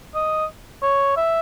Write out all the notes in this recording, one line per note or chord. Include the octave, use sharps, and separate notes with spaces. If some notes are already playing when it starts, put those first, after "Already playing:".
D#5
C#5
E5